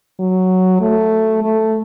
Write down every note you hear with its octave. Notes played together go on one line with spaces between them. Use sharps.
F#3
A3
A3